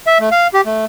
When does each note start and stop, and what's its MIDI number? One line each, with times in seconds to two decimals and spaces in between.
0.07 0.18 76
0.20 0.29 57
0.32 0.47 77
0.54 0.61 67
0.66 0.85 57